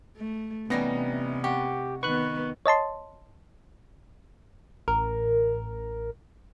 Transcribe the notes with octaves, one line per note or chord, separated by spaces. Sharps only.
A3
C3 E3 G3 B3 C#4 D#4 A#6
F#4 G4
D#3 B3 B4 C#6 F#6
C#5 D#5 A5 C6
A1 A#4